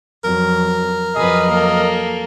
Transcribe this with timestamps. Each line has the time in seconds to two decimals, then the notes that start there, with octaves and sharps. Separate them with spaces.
0.24 F2 F#3 A#4
1.16 F2 F#3 G#4 B4 D#5
1.49 A#3 A4